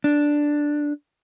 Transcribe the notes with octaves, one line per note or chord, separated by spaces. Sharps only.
D4